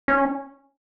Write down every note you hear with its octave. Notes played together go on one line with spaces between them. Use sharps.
C#4